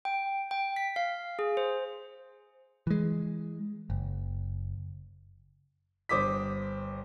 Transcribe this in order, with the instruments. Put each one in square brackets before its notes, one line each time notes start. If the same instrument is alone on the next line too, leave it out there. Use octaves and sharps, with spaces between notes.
[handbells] G5
G5
B6
F5
G#4
C5
[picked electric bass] E3 G#3
F#1
[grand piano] G1 C5 D6 D#6 B6